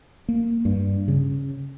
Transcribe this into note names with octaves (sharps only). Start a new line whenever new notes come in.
A#3
G2
C#3